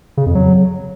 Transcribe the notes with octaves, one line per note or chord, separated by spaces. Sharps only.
C#3
F2
F#3